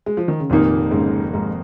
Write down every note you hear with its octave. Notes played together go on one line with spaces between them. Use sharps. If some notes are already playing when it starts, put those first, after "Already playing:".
G#3
F3
D#3
C#3
F1 F2 A#2 D#3 A#3 D#4
G#2 C#3
G#2